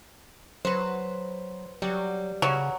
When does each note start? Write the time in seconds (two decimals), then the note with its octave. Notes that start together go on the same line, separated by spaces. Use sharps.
0.65 F#3 B4 C5
1.82 F#3 G3
2.42 C#3 F#3